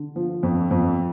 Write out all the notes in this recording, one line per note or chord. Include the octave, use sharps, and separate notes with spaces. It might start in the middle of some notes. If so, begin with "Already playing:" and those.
Already playing: D3
F3
F2
F2